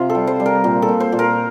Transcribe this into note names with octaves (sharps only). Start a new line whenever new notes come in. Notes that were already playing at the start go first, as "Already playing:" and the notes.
Already playing: C3 F4 C5
A4
G3
C5
G3
A#4
A#2
A4
A#2
C5
A#2
A#4